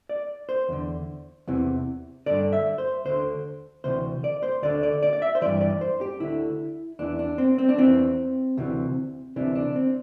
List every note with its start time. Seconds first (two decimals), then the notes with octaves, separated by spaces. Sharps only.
0.09 D5
0.49 C5
0.69 E2 D3
1.48 E2 C3 E3
2.26 G2 D3 D5
2.53 E5
2.78 C5
3.05 D2 D3 C5
3.84 D2 C3 E3 C5
4.24 D5
4.43 C5
4.62 D2 D3 D5
4.83 D5
5.03 D5
5.13 D5
5.22 E5
5.35 C5
5.42 G2 E3 D5
5.61 D5
5.81 C5
6.01 G4
6.20 D2 D3 E4
6.99 E2 E3 D4
7.19 D4
7.38 C4
7.58 C4
7.69 D4
7.78 E2 E3 C4
8.57 D2 C3 E3
9.36 D2 C3 E3 D4
9.55 D4
9.76 C4